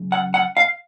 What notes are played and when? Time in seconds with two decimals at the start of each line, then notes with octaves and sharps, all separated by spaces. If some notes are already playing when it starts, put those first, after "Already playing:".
Already playing: F#2 C#3
0.12 F#5
0.34 F#5
0.57 F5